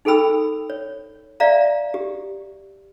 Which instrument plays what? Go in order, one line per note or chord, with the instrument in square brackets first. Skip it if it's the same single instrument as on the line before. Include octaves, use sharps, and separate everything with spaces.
[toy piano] D#4 G#4 A4 G5 B5 E6
C#5
D5 E5 F5 A#5
G4